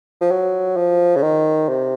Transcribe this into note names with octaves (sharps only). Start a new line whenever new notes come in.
F3
F#3
F3
C#3
D#3
C3